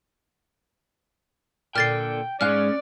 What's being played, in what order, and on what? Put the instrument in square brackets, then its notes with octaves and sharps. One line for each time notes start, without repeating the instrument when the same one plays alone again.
[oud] A#2 D3 [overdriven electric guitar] G5 [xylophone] F6 A6 C7
[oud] G#2 G#3 F5 [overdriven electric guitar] C#4 [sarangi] D5 [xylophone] F6 F#6